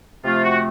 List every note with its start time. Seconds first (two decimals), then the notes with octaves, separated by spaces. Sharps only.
0.25 C3 F3 A3 F4
0.44 F#4